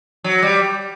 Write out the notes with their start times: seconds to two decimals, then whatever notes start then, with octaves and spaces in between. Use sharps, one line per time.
0.24 F#3
0.42 G3